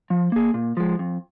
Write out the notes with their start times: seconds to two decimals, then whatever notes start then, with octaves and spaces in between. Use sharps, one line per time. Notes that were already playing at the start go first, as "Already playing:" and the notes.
0.10 F3
0.32 A#3 G#4
0.54 A#2
0.77 F3 G#3
0.99 F2